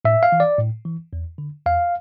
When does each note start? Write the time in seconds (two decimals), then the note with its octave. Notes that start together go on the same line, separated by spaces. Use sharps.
0.05 A2 E5
0.23 F5
0.32 E3
0.40 D5
0.58 A2
0.85 E3
1.13 E2
1.38 D3
1.66 E2 F5